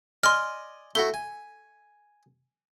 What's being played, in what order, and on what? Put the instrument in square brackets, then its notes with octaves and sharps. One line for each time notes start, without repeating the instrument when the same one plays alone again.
[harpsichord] D5 D#5 G#5 [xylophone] C6 F6
[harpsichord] A3 E4 F#4 [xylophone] G7
[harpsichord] G#5